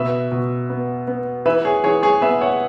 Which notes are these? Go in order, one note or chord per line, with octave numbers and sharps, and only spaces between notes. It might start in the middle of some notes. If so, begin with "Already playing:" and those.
Already playing: B2 B4 E5
B2
B3
B3
E3 B4 E5
G#4 C#5
E3 G#4 C#5
G#4 C#5
B3 B4 E5
C#5 F#5